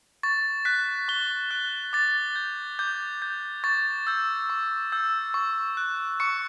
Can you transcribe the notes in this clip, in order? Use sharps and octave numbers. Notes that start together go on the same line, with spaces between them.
C#6 A6
F#6 B6
C#6 G7
F#6
D6 A6
G6
D6 G6
G6
C#6 A6
E6 G6
C#6
E6 G6
C#6
F#6
C#6 C#7